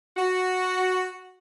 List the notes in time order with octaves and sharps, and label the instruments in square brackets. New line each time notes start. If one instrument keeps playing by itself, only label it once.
[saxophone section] F#4